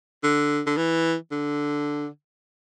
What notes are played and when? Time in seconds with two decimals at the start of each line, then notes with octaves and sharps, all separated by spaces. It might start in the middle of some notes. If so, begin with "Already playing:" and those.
0.23 D3
0.66 D3
0.77 E3
1.31 D3